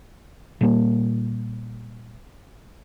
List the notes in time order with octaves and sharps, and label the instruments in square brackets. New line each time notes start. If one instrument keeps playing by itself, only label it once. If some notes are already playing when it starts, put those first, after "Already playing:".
[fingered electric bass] A#2 G3 A3 A#3